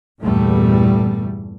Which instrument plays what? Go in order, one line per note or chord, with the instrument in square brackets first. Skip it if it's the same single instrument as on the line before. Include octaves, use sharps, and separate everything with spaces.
[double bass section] E2 G2 A#2 G3 A3